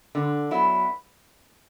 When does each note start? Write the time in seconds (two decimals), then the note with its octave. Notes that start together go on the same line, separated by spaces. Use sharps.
0.15 D3
0.51 F#3 B3 E4